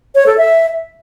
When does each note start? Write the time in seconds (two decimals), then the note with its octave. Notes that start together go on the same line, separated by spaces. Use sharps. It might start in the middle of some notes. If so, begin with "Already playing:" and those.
0.15 C#5
0.26 A4
0.38 E5